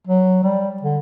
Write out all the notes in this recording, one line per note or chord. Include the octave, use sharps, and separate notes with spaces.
F#3
G3
D3